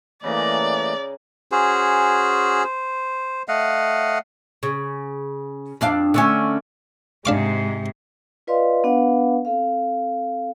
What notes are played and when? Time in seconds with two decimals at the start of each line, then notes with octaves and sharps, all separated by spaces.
0.24 C#3 E3 A3 A#3 D5 D#5 A#5
1.51 C#4 F#4 G#4 C5
2.64 C5
3.48 A3 D#5 F5 F#5
4.63 C#3
5.81 F2 D4 F5
6.14 D3 A3 C#4
7.25 G#2 C3 G#3 D4 F5 D6
8.47 F4 B4 D5 D#5 F5 C6
8.84 B3 D4 B4 F5 F#5
9.45 C4 A4 F5